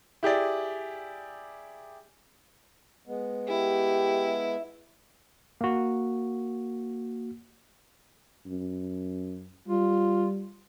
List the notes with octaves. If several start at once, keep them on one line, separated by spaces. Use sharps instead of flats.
E4 G4 G#4 D5
G#3 B3
E4 G4
A#3 F#4
F#2
G3 F4